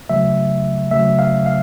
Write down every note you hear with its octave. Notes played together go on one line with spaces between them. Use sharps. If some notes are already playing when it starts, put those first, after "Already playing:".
C#3 F#3 A3 E5
C#3 F#3 A3 E5
F5
F5